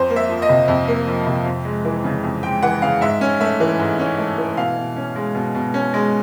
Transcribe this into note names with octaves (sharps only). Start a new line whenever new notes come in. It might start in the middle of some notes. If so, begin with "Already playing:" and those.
Already playing: F2 C5
A#3
E5
F3
D#5
C3
F2
A#3
F3
C3
F2
G#3
E3
C#3
F2
G#3 G5
E3 F#5
C#3 F5
G#2 E5
C#4
A3 E5
E3
G#2
C#4
A3
E3
B2 F5
B2
C#4
G#3
B2
B2
C#4
G#3